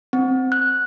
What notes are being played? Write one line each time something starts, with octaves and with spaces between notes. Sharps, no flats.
C4
F#6